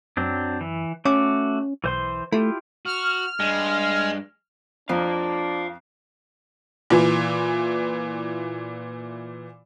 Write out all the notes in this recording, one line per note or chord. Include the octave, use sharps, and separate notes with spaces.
F#2 F#3 C4 D4
E3
A3 C#4 F#4 D6
B1 E3 C5 C6
A3 E4 F4 G4
F#4 F6
G2 G#3
F2 F3 D4 F5 A#5
A#2 E3